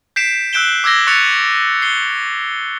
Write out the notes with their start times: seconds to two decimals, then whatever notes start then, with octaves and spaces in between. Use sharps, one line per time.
0.16 G6 B6 C7 D7 E7
0.53 E6 F#6 G6 D7 E7 G7
0.84 D6 E6 G#6 A#6 G7
1.07 C#6 F#6 A6 C#7 F7
1.82 C7 G7